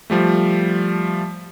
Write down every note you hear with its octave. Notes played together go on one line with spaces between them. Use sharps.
F3 G3 A3